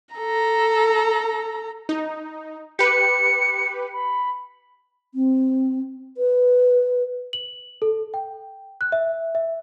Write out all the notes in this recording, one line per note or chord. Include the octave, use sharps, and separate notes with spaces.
A4 A#5
D#4
G4 B4 C#7
B5
C4
B4
F#7
A4
G5
F#6
E5
E5